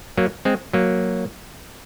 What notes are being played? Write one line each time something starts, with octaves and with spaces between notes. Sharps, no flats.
F#3 A#3
G#3 C4
F#3 A#3